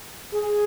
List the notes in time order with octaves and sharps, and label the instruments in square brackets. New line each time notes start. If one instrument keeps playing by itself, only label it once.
[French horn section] G#4